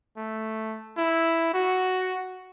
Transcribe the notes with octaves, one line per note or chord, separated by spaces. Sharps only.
A3
E4
F#4